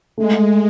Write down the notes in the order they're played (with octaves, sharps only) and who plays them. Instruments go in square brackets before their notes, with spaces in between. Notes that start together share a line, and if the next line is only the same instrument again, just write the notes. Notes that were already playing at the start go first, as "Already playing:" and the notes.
[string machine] G#3 [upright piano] A3